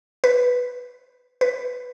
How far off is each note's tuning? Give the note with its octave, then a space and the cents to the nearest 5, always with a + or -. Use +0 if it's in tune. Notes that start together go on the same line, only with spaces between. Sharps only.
B4 +0
B4 +10